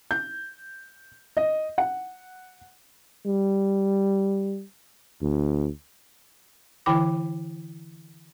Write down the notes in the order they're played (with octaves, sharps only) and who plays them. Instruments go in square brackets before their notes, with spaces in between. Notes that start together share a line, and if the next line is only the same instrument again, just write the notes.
[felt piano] G6
D#5
F#5
[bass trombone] G3
D2
[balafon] D3 E3 E4 G5 B5 D6